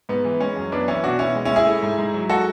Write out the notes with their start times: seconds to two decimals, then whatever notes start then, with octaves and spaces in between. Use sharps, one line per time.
0.09 G#2 B3
0.25 E3
0.41 G#3 C#4
0.56 F#2
0.72 F#2 B3 D4
0.88 E3 C#4 E4
1.03 B2 D4 F#4
1.19 B2 C#4 E4
1.35 G#3
1.45 C#4 E4
1.51 G#3
1.56 E4 G#4
1.67 A3
1.82 G#2
1.98 G#2
2.14 F#3
2.29 G#3 F#4 A4